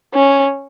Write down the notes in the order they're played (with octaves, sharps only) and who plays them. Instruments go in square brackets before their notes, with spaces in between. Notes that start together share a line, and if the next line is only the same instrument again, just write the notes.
[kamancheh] C#4